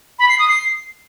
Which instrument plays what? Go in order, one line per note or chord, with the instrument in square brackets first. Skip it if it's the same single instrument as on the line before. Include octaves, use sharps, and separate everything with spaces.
[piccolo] B5
C7
D#6
C7